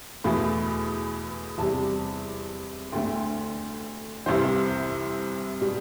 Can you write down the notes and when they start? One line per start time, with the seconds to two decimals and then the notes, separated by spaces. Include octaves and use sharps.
0.24 E2 B2 A3 B5
1.58 E2 C3 G3 A5
2.92 D2 D3 A3 G5
4.26 C2 C3 E3 C5
5.61 B2 G3